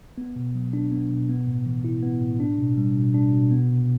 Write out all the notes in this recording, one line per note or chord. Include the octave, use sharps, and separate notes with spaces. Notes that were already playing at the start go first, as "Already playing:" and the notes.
B3
B2
F#3
D4
B3
B2
B3
A2
E3
E4
B3
A2
D4
B2
G3
B2
D4
B2
B3
C3